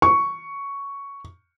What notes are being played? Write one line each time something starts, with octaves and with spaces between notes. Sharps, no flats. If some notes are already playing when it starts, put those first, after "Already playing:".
C#6